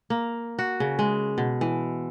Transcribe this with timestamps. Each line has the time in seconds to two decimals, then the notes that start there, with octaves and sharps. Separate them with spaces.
0.10 A#3
0.59 F#4
0.80 C#3
0.99 G#3
1.38 B2
1.61 E3